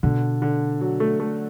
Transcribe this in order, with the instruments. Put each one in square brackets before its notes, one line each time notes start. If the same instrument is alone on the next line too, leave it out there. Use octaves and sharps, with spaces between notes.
[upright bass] B2 [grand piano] D3
[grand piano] D3
F#3
A3
A3